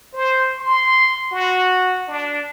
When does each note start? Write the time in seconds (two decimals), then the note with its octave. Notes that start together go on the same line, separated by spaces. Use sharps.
0.14 C5
0.59 C6
1.32 F#4
2.08 D4